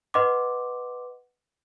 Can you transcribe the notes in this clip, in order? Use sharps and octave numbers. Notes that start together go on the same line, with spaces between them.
B4 D#5 F#5 C6 D6